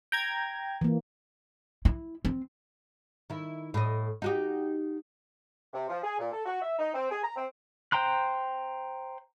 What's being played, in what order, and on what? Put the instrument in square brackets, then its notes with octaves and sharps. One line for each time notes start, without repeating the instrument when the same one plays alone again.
[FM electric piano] G5 A#5 G#6
[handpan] E3 A#3
[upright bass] E4
C4
[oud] D#3 E4
A2 D#5
D#4 F#4 G4
[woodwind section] C3
F3
G#4
A#2
A4
F#4
E5
D#4
C4
G#4
A#5
C4
[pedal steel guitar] C5 G5 A#5 C6 F#6